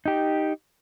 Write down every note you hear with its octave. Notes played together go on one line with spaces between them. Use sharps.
D#4 G4